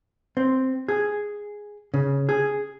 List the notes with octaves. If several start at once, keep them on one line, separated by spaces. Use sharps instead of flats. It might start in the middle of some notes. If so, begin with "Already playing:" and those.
C4
G#4
C#3
G#4